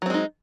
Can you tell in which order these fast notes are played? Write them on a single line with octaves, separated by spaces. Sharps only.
F#3 C4 G#3 D#4